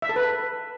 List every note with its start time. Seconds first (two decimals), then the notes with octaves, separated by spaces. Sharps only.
0.02 E5
0.09 A4
0.16 B4